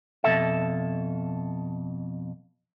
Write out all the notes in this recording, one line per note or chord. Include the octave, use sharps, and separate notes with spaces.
F2 B2 A4 E5